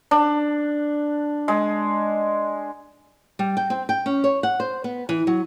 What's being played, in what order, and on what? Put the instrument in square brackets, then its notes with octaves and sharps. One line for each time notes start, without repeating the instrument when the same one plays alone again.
[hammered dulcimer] D4
G#3
[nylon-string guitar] G3
G5
C4
G5
C#4
C#5
F#5
C5
B3
E3
F#3